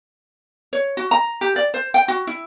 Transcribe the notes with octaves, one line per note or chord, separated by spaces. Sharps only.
C#5
F#4
A#5
G4
D5
C5
G5
F#4
E4